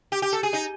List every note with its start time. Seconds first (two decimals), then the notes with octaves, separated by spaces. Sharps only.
0.12 G4
0.22 G4
0.33 A4
0.43 G#4
0.53 D#4